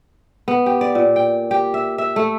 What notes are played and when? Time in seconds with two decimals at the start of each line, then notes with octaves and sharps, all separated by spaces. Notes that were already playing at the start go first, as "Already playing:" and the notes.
0.48 B3
0.66 G4
0.81 D5
0.95 A#2
1.16 G5
1.51 G4
1.74 E5
1.98 E5
2.16 A3